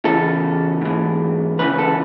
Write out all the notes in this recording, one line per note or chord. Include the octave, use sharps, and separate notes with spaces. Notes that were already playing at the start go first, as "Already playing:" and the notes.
E2 C#3 E3 A4
G#2 E3
D2 C#3 E3 B4
A4